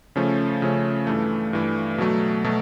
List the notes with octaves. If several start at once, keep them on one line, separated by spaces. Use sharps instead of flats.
C#3 F3 A3 C#4
C#3 F3 A3 C#4
G2 E3 A3
G2 E3 A3
B2 F#3 A3
B2 F#3 A3